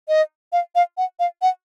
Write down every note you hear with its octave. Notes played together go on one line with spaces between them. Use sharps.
D#5
F5
F5
F#5
F5
F#5